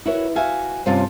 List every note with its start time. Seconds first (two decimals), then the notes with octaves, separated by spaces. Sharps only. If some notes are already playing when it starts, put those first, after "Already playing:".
0.05 E4 F#4 A#4 B4 C#5
0.36 F#4 E5 F5 G#5
0.86 G2 C3 C#4 F4 G4 D5